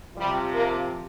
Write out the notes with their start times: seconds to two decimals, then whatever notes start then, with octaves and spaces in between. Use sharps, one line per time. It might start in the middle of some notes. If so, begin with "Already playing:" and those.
0.16 C3 F3 G3
0.53 A#3